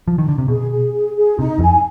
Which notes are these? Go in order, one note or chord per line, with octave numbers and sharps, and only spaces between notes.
F3
D#3
D3
C3
B2 G#4
G#4
G#4
G#4
C3 D#4
F2 G#5